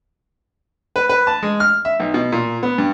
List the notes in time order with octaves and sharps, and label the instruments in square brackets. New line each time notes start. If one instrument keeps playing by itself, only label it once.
[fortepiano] B4
B4
A5
G#3
F6
E5
B1
B2
A#2
B3
G2